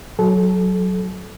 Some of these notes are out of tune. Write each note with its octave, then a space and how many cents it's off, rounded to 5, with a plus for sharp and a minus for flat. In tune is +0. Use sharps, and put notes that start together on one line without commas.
F#3 +0 A4 -30